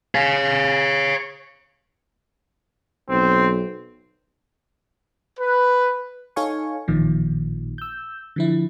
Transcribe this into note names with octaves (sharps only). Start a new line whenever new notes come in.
C#5 F5
B1 C4
B4
D#4 A4 C#5 F5 G#5 C#6
A1 A#2 D#3 F3
E6 G6
D3 F3 E4